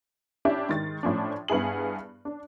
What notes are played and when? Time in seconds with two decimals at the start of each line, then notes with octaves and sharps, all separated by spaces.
0.45 C#4 D4 E4 G4 E5
0.69 G#2 D#3 A6
1.03 A2 F3 C#4 D4
1.48 G2 B3 E4 G#4 F#7
2.25 D4